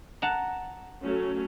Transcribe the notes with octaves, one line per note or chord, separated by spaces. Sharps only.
F#5 A5 A#5
F#3 A3 C#4